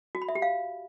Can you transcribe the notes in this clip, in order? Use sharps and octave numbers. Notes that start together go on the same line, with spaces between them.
F#4
B5
E5
G4
F5